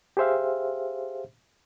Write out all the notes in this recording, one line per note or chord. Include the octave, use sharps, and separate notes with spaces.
G4 G#4 C5 E5 F5